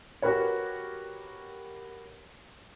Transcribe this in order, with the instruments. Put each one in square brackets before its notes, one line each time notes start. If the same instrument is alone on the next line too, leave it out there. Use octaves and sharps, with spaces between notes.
[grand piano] F#4 G4 A#4 B4 C#5